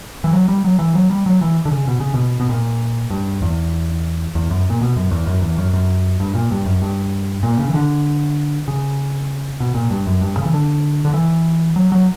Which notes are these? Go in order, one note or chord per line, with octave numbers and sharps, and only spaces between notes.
E3
F#3
G3
F#3
E3
F#3
G3
F#3
E3
D3
C#3
B2
C#3
B2
B2
A#2
G2
E2
E2
F#2
A#2
B2
F#2
E2
F#2
E2
F#2
F#2
G2
A#2
G2
F#2
G2
A#2
C#3
E3
D3
C#3
B2
A#2
G2
F#2
G2
C#3
E3
D3
D3
E3
F#3
F#3